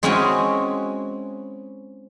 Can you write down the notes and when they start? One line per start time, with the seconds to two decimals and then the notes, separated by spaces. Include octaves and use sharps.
0.03 G#3 C4 C#4 E4 F#4 G#5